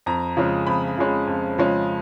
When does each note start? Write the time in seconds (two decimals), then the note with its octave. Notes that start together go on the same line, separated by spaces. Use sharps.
0.06 F2 A#5
0.37 C#3 F3 G#3 C#4
0.67 F2 B5
0.97 C#3 F3 G#3 C#4
1.27 F2
1.58 C#3 F3 G#3 C#4